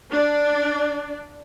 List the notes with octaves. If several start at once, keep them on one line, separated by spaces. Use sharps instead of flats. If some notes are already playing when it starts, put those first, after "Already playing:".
D4 D5